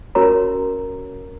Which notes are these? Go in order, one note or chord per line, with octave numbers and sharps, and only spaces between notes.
C#4 F#4 A#4 C#5 A#5